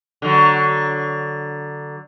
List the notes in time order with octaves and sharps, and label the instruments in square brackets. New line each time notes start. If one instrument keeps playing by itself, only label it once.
[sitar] D3 F#3